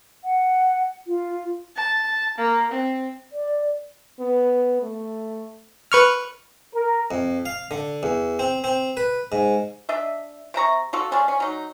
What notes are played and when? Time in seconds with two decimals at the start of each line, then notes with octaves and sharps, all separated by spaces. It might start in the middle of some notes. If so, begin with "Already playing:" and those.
0.24 F#5
1.07 F4
1.76 A5
2.37 A#3
2.71 C4
3.32 D5
4.20 B3
4.82 A3
5.92 B4 C#6 F6
6.75 A#4
7.11 F2
7.46 F5
7.71 D3
8.03 E2
8.39 C4
8.64 C4
8.97 B4
9.32 G#2
9.89 D4 D#5 E5
10.54 C3 E5 A#5 C#6
10.93 F4 F#4 A4
11.11 D3 G#3 C#4 D4
11.28 C#4
11.40 F#3 D#4